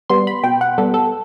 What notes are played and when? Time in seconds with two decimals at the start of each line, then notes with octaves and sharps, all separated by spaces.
0.10 G3 B3 C6
0.27 B5
0.44 B2 G5
0.61 F#5
0.78 G3 B3 A4
0.94 A4